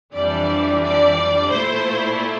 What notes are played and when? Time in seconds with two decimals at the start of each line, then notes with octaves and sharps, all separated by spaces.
0.14 F2 E3 G3 D4 D5
0.83 D5
1.51 A#2 A3 E4 C5